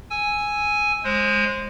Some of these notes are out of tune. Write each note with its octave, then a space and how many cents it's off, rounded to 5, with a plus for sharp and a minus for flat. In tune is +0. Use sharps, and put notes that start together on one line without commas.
G#5 +0 E6 +0
G#3 +0 C5 +30